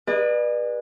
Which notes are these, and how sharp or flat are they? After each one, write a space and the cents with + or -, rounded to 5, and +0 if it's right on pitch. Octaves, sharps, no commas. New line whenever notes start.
G#4 -20 B4 -25 D5 +40